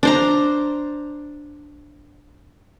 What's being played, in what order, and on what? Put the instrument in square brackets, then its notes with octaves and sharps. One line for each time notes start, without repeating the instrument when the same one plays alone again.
[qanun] D4 C5 A#5